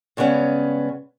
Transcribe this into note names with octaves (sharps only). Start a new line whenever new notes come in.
G2 C#3 G#3 B3 C#4